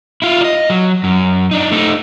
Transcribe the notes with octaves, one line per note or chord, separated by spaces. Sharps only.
E4 F4
D5 D#5
F#3
F#2
D4 D#4
A3 D#4